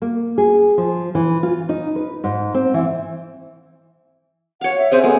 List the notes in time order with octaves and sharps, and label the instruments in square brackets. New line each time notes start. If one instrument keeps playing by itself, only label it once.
[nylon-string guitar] A#3
G#4
F3
E3
F4
D#4
B4
G#2
C4
E3
[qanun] C#5 F5 [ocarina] F#5
[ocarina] E5
[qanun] C#3 C4 G#4 [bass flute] C5 [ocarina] E5
[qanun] G#3 [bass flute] B3 [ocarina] A4